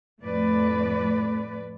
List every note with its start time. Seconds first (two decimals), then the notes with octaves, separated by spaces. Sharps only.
0.22 F2 A2 A3 B4 D5